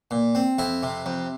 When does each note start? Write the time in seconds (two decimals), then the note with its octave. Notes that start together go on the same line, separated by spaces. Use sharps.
0.11 A#2
0.35 C4
0.58 F2 E4
0.83 C3
1.06 F2